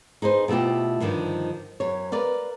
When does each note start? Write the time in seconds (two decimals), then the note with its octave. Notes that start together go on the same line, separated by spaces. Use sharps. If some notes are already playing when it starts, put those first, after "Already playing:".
0.22 D#4 G#4 B4 C5
0.48 B2 A3 E4 F4 G4
1.00 G2 D3 D#3 F3 D4
1.80 F#2 C#5
2.12 A#4 B4 D5 F5